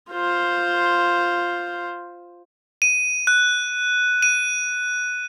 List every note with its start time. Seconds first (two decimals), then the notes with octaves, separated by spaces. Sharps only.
0.11 F4 C5
2.82 D#7
3.27 F#6
4.23 D#7